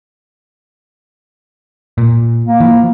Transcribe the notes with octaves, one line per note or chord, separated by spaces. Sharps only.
A#2
A#3
E3 F3